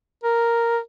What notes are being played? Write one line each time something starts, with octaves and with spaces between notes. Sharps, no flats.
A#4